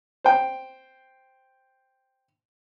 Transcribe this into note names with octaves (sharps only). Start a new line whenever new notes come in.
C5 G5